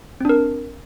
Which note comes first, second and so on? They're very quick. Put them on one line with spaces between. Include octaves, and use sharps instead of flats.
C4 D4 A#4